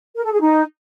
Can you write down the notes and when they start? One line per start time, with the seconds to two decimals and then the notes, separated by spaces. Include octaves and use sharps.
0.16 A#4
0.24 A4
0.33 G#4
0.41 D#4